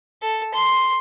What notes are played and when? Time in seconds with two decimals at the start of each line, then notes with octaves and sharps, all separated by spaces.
0.22 A4
0.54 C6